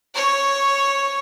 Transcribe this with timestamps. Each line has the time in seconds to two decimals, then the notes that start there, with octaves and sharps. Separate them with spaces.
0.15 C#5 C#6